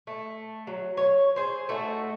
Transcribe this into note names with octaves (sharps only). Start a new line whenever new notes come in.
A3
F#3
C#5
G#4 C5
A3 D#4 F#4 A4